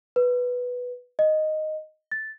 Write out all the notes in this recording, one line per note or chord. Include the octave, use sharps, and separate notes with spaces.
B4
D#5
A6